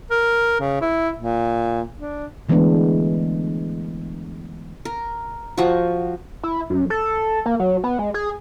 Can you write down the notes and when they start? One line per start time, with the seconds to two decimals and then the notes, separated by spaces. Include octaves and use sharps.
0.11 A#4
0.60 C#3
0.81 E4
1.18 A#2
1.99 D4
2.49 D3 E3 G#3 A3 B3 D4
4.85 A#4
5.58 F3 F#4
6.43 E4
6.70 F#2
6.90 A4
7.46 A#3
7.60 F#3
7.84 B3
7.99 G#3
8.14 G#4